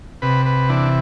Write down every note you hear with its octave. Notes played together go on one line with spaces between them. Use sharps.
C3 B4
B4
E3 D4